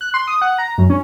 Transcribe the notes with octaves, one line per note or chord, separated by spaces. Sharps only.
F#6
C6
D#6
F#5
A#5
F#2
C#4